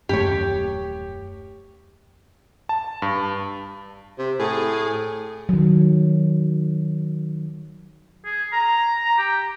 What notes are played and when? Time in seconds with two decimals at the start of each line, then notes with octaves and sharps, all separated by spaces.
0.09 D#1 F#2 A3 G4 C#5
2.69 A5
3.02 G2
4.19 C3
4.40 A2 G#4
5.49 D#3 F#3
8.25 G#4
8.53 A#5
9.05 A#5
9.18 G4